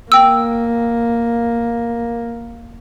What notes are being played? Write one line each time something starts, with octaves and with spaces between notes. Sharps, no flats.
A#3 G5 E6